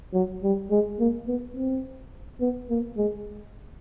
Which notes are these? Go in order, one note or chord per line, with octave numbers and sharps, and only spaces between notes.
F#3
G3
G#3
A#3
B3
C4
B3
A#3
G#3